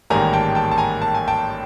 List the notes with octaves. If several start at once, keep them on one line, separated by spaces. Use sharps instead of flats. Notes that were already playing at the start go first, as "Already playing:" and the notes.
A1 G#2 D#3 G3 A#3 G#5 A#5
G5 A5
G5 A5
A5
G#5 A#5
A5
G#5
G5 A5